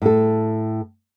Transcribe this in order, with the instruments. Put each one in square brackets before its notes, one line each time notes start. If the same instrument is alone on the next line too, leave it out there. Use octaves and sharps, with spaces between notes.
[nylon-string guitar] A2 A4